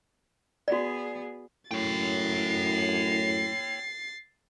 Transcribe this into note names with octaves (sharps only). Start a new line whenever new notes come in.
B3 F#4 G#4 D5
F#2 A2 C#5 G5 A6 C7